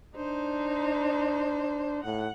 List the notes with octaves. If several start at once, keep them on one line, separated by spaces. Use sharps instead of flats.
D4 D#4 C5
A2 F#5